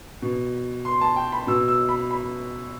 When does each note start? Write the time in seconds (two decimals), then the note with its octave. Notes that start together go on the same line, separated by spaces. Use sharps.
0.22 B2
0.85 C6
1.01 A5
1.16 G5
1.32 B5
1.47 B2 E6
1.68 E6
1.89 B5
2.11 B5